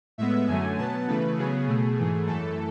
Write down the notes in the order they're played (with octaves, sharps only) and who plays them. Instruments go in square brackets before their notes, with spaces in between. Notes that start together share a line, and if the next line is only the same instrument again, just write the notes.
[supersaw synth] A2 G#3 B3 E5
F#2 D3 F#3 A3 G#5
B2 F#3 B3 A5
C#3 E3 A3 B4
C#3 F#3 B3 G#4
B2 A3
G#2 E3 A3
F#2 E3 A3 A4